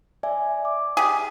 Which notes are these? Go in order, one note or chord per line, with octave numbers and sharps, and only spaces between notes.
D5 E5 G#5
D6
G4 G#4